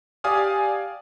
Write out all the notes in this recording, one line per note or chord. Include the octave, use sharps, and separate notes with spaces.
G4 D5 F5 G#5 D#6 F6